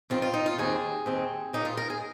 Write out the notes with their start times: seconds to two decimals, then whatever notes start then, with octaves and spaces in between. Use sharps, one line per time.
0.10 F2 D#3 C4 F4
0.22 F4
0.34 D#4
0.46 F4
0.58 D#2 D#3 C4 G#4
1.06 D#2 D#3 C4
1.53 A#2 A#3 D#4
1.65 F4
1.77 A#4
1.90 G#4